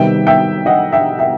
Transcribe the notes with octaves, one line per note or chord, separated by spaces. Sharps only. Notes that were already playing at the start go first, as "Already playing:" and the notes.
Already playing: C3 D#3 G3 B3 E5 G5
E5 G5
D#5 F#5
E5 G5
E5 G5